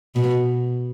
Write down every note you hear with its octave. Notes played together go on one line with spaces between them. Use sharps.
B2